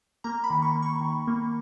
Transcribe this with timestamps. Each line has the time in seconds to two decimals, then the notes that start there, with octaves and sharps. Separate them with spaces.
0.24 A#3 A#5
0.44 B5
0.50 D#3
0.62 C#6
0.76 A#3
0.82 C#6
1.01 D#3
1.28 A#3